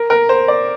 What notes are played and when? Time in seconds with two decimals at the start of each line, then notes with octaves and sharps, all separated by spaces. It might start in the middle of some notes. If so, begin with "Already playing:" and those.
Already playing: A#4
0.10 A#4
0.29 C5
0.48 D5